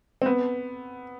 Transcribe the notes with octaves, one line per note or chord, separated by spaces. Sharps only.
C4
B3